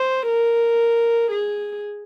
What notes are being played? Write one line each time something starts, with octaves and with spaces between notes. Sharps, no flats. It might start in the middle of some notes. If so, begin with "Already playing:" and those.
Already playing: C5
A#4
G#4